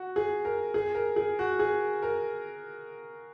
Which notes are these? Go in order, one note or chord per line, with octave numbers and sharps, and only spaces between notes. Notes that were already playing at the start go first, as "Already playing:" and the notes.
Already playing: F#4
G#4
A#4
G#4
A#4
G#4
F#4
G#4
A#4